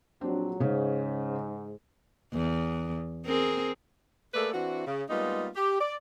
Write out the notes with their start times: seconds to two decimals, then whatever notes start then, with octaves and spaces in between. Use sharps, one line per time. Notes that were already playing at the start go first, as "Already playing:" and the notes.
0.21 A#1 F#3 C4 D4
0.60 G#2 C#3 C#4
2.34 E2
3.26 C4 G#4 A#4
4.34 A3 A#3 G#4 A4 B4 D5
4.53 E3 C4 D4 E4 F#4
4.87 C#3
5.10 G3 G#3 A#3 B3 D#4 F4
5.56 G4
5.80 D5